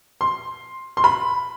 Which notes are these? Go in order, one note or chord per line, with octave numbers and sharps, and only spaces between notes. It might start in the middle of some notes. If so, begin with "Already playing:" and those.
C6
C6
B5